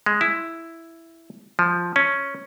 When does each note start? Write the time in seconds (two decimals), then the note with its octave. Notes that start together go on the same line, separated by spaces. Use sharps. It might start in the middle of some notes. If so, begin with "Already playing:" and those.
0.06 G#3
0.21 E4
1.59 F3
1.96 C#4